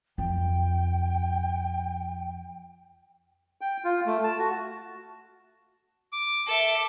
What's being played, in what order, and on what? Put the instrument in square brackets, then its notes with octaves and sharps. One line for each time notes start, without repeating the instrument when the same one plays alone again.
[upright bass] F2 [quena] G5
[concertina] G5
F4
A3
A5
F#4
[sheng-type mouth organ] D6
[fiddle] A4 E5